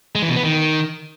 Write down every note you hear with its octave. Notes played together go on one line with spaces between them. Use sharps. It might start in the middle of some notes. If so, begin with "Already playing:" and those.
G#3
E3
B2
B3
D#3